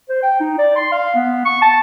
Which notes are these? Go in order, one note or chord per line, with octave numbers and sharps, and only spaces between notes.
C5
G5
D#4
D5
C6
F5
B3
C#6
A5